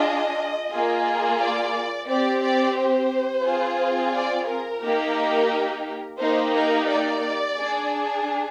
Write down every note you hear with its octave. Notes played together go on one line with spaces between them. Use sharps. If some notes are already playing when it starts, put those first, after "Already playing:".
Already playing: D4 F4 G#4 D#5
A#3 F4 G#4
D5
C4 G4 D5
D5
C5
C4 F4 G#4
D5
A#4
A#3 D#4 G4
A#3 D#4 G4 C5
A#4
D5
D4 G#4